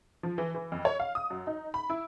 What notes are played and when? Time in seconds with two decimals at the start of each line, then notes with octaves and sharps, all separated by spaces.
0.23 F3
0.38 E3
0.55 E3
0.72 F2
0.85 C#5
1.00 F5
1.15 D#6
1.30 F#2
1.47 D#4
1.74 B5
1.90 E4